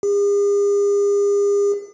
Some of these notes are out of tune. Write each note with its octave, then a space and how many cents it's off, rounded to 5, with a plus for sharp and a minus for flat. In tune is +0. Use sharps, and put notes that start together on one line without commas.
G#4 -45